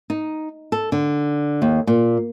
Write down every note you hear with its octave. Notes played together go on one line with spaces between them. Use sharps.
D#4
A4
D3
D#2
A#2